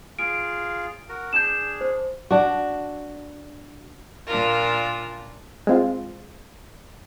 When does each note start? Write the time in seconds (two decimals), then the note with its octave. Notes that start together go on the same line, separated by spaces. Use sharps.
0.19 F4 G#4 F5 D7
1.09 F#4 A#4
1.33 D4 G#4 G6 E7
1.81 C5
2.31 D4 F#4
4.26 A#2 D4 F4 A#4
5.67 G#3 C4 F4